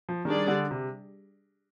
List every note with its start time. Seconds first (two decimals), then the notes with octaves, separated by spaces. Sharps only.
0.09 F3
0.25 D#3 G3 D4 G#4 D5
0.48 D3
0.71 C3